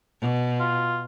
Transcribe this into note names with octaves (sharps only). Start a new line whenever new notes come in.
B2
F4